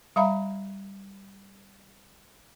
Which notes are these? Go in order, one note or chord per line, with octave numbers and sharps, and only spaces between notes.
G3 E5 F5 A#5 B5